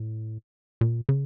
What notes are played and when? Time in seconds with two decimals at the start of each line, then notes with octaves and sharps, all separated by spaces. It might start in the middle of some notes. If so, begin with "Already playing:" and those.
Already playing: A2
0.81 A#2
1.09 C#3